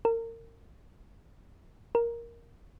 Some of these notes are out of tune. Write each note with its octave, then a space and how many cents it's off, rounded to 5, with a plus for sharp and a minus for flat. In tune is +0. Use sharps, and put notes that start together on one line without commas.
A#4 -30
A#4 +5